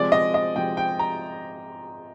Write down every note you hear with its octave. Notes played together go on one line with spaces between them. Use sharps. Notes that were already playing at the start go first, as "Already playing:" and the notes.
Already playing: C3 F3 G#3 D5
D#5
D#5
C3 F3 G#3 G5
G5
A#5